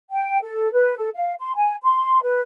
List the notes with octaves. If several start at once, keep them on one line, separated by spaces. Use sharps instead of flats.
G5
A4
B4
A4
F5
C6
G#5
C6
B4